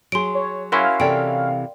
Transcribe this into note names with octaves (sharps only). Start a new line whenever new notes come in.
F#3 G#4 C6 D7
C#5
C#4 E4 F#4 A#4 F5 C6
C3 E3 A4 D5 G5 D7